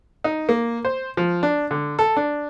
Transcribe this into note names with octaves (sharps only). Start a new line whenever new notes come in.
D#4
A#3
C5
F3
D4
D3
A4
D4